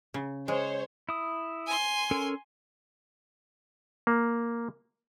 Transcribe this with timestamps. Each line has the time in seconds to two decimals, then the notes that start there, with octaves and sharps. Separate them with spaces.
0.14 C#3
0.48 G#3 C5 C#5
1.09 E4 D#6
1.67 G#5 C6
2.11 C#4 A4 A#4
4.07 A#3